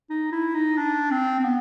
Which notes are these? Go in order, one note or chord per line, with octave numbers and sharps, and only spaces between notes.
D#4
E4
D#4
D4
C4
C4
B3